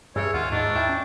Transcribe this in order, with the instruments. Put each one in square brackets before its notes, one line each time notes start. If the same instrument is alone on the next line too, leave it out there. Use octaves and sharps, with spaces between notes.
[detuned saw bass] G2 [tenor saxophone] C#3 [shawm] C#5 [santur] E5
[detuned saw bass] D#2 [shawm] F4 [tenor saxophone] F#4
[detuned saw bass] G#2 [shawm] D4 [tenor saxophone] D#4 [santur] C#6
[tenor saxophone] E4 [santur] G5
[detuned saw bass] C#4